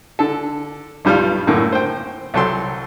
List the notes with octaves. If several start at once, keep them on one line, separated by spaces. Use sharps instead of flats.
D3 A4
B1 G2 G3 F4 F6
F#2 A2 D3 A#3
C5 G5
C2 F#3 A4 G5 C6